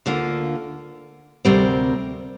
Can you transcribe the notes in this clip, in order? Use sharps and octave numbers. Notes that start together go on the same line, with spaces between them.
D2 D3 A#3 F4
D2 C3 G3 C4 A#4